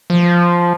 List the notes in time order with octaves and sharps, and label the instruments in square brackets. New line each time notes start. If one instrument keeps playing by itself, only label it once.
[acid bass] F3